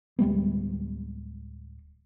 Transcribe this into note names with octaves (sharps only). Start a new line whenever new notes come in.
D1 G3 G#3 B3